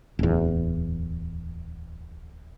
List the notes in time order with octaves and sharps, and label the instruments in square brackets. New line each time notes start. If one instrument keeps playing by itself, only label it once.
[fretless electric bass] D1 E2